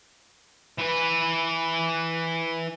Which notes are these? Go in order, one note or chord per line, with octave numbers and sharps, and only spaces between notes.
E3 B4